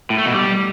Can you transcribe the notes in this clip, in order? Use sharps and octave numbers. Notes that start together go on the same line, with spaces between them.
A2
A3
B2
G3